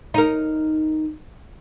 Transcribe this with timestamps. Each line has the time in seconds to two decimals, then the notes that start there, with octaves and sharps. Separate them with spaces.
0.14 D#4 A#4